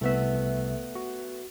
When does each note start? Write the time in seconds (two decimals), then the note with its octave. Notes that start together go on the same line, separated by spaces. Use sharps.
0.01 C2 A3 B3 E5
0.95 F#4